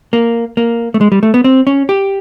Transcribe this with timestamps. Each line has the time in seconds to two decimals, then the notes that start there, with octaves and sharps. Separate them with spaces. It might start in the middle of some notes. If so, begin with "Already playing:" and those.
0.13 A#3
0.57 A#3
0.94 A3
1.01 G#3
1.12 G3
1.23 A3
1.34 B3
1.44 C4
1.67 C#4
1.89 G4